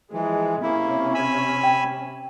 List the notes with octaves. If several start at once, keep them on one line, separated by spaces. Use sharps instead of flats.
E3 F3 G#3
C3 A#3 C#4 E4
G#5 B5 E6
G5